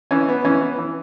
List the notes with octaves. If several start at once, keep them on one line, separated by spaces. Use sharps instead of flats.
E3 C#4
B3
E3 C#4
B3
E3